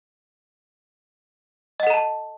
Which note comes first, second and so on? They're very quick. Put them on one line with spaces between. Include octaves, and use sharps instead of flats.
D#5 F#5 A4 A#5 A5